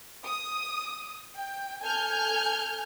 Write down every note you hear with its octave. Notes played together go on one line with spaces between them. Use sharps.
D#6
G5
A4 G#5 F6 G6 G#6